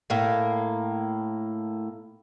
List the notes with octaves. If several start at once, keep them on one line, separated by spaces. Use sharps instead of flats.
A2 A#3